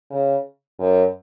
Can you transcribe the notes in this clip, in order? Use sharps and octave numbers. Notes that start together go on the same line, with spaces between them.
C#3
F#2